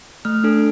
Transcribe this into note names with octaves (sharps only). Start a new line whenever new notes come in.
A3 F6
D4 A4